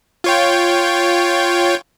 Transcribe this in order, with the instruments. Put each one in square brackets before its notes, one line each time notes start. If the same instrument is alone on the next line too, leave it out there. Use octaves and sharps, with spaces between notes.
[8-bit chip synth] F4 C#5 G5